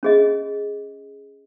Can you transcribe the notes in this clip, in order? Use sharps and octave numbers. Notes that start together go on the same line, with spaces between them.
C#4 G#4 D#5